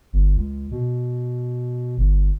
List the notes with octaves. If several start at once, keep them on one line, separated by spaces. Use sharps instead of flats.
G1
C#2
B2
G1